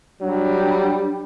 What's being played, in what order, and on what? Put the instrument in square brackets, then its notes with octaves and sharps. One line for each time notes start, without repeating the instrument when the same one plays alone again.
[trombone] F#3 [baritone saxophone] G3 [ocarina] D4